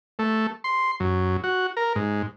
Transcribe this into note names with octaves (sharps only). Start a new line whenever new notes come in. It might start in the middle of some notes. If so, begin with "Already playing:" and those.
A3
C6
F#2
F#4
A#4
G#2